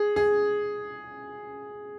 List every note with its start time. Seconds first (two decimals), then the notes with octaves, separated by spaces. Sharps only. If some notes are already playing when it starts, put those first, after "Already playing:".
Already playing: G#4
0.16 G#4